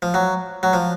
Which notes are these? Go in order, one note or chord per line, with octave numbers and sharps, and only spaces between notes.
F3
F#3
F#3
F3